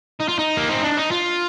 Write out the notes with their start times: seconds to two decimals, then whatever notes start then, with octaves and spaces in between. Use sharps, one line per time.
0.20 D#4
0.28 F4
0.39 D#4
0.57 A#3
0.70 C4
0.84 D4
0.97 D#4
1.11 F4